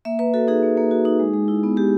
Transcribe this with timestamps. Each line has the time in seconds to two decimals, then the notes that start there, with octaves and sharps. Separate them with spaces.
0.05 A#3 E5
0.19 A#3 B4
0.34 F#4 A4
0.48 D#4 G#4
0.63 A#3
0.77 A#3
0.91 F#4
1.05 D#4
1.19 G#3
1.34 G#3
1.48 E4
1.63 B3
1.77 G#3 G4